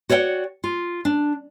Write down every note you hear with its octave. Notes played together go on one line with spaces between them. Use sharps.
F#4 C#5 D5 F5 G5
F4
D4